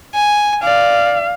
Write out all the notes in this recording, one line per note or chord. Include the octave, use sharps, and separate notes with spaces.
G#5
D5 F5